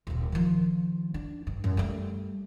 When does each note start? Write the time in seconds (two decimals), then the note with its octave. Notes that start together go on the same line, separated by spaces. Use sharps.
0.07 D#1 C3
0.32 D#3 F3
1.14 D4
1.47 G2
1.64 F#2 A3
1.77 G3 A3